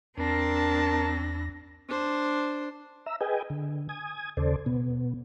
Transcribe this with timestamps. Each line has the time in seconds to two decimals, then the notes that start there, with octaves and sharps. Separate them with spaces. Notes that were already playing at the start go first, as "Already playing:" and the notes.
0.18 E2 C4 D4 A#4 A5 A#6
1.89 D4 C5
3.06 E5 A#5 E6
3.21 G#4 B4 D#5 G5 G#5
3.50 D3
3.89 G#5 D#6 G#6
4.37 D#2 C#3 A4 C5 D5
4.66 B2 B3